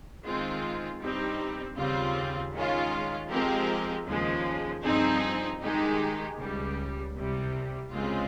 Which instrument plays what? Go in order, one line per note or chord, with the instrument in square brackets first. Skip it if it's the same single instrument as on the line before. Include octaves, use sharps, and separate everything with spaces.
[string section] D#3 G#3 C4 F4
G2 G3 C4 D#4
D#2 C#3 G3 C4 F4
D#3 G#3 C#4 F4
F3 G#3 C4 G4 A#4
D#2 C#3 F3 G#3
G2 F3 C4 D#4 G#4
D#3 G#3 D#4 G4
C#2 C#3 G3
C2 C3 G3
C#2 C#3 G#3 C4 F4